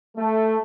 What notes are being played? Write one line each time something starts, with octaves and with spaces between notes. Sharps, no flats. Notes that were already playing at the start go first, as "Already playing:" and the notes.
A3